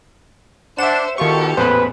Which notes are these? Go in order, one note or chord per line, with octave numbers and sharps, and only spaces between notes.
D4 C5 E5 F#5 E7
D2 B2 D#3 F4 G4 A4 C#6
A1 E2 A#2 B4 C5 B5